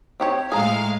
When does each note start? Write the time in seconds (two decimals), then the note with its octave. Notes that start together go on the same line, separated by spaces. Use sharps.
0.20 C4 G4 C#5
0.52 A2 G#3 G#4 F5 A#5